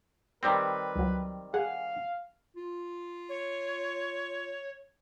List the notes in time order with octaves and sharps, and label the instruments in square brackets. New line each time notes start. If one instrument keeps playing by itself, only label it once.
[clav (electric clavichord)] D#3 G3 C4 [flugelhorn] B4
[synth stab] C#2 F#3
[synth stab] G#4 F#5 G#5 [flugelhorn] F5
[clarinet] F4
[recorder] C#5